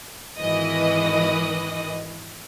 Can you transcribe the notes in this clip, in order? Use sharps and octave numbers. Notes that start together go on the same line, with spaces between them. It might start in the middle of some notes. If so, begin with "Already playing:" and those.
G#1 D#3 E3 B4 D#5